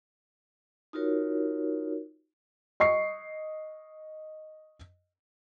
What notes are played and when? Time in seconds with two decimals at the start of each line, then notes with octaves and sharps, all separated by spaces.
0.93 D#4 F4 F#4 A#4 C#5
2.80 D#5 C#6 C7